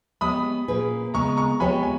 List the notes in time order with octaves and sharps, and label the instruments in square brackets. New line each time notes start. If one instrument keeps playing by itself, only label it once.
[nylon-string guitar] G#3 B3 G4 C#5 [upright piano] B5 D#6
[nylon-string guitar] A#2 A#3 C#4 G#4 B4
[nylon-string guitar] C#3 G#3 B3 [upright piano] A#5 C#6
[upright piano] A#5 C#6
[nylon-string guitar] G#3 B3 G4 C#5 [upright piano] G#5 B5
[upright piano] G#5